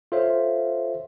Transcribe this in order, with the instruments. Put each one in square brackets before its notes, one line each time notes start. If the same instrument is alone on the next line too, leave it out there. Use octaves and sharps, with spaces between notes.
[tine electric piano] F4 A4 C5 C#5 E5 F5